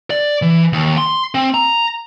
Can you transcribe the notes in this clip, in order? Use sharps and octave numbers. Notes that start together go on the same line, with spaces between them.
D5
E3
D#2
C6
C4
A#5